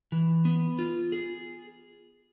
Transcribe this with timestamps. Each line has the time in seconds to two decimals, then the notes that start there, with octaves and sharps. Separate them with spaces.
0.12 E3
0.45 B3
0.79 F4
1.12 G#4